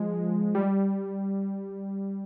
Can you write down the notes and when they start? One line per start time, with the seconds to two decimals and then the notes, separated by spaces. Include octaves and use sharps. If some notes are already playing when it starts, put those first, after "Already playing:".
Already playing: F3 G#3
0.55 G3